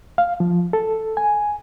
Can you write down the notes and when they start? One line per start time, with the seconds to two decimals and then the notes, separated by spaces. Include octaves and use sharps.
0.18 F5
0.40 F3
0.73 A4
1.17 G#5